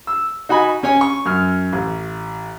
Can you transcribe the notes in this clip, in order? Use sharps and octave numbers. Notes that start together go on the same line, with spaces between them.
E6
D#4 F#4 G#5 B5
C#4 C#5 G#5
C#6
F#2 F6
A1